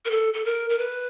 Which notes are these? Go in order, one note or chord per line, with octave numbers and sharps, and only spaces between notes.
A#4
A4
A4
A#4
A#4
B4